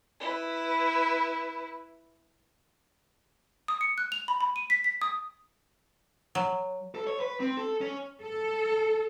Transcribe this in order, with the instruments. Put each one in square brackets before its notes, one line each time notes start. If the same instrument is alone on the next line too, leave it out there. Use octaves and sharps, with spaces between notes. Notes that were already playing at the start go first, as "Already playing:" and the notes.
[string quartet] E4 B4
[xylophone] D#6
C#7
F#6
F7
B5
B5
D#7
B6
B6
D#6
[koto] F#3
[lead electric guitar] A4
C#5
B4
C4
A4
C#4
[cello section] A4